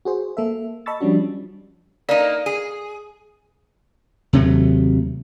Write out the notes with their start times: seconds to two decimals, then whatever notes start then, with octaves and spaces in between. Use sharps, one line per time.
0.05 F#4 G#4 C5
0.37 A#3 A4 E5
0.86 D#5 A5 B5 C#6 E6 A6
1.00 F3 G3 C#4 D4 F#4
2.09 A#3 D#4 D5
2.46 G#4
4.33 D#2 C3 F#3 A3